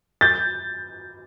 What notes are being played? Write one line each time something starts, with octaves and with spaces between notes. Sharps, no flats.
G6 A6